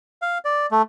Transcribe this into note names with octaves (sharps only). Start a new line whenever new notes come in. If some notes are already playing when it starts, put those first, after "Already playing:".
F5
D5
A3